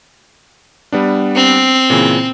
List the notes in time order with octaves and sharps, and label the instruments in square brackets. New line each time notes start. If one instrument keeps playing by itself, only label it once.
[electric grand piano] G3 B3 D4
[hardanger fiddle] C4
[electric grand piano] A#2 C#3 E3